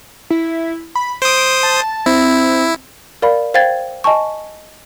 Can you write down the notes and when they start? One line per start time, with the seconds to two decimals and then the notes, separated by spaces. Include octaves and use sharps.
0.30 E4
0.95 B5
1.22 C5 D#6 D7
1.63 A5
2.06 C4 E4
3.22 A#4 D5 F5 B5
3.54 C5 F5 G5 G#6 A6
4.04 D#5 G#5 A5 C#6